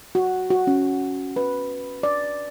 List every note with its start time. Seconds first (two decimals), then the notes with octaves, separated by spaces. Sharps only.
0.15 F#4
0.50 F#4
0.67 C#4
1.36 B4
2.03 D5